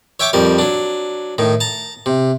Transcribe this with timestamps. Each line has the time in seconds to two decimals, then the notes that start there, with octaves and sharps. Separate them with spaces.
0.20 C#5 E5 G5 C#6 D6
0.33 F2 G3 A#4
0.59 F#3 D4
1.38 A2 D#3
1.60 A5 A#5
2.06 C3